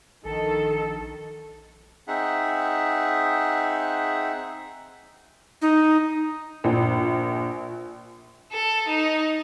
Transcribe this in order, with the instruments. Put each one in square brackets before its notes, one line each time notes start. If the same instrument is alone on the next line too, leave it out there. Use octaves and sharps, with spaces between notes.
[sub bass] A#1 [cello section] D#3 A4
[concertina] C4 D#4 G#4 E5 F#5
[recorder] D#4
[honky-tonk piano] A#1
[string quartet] A4
D#4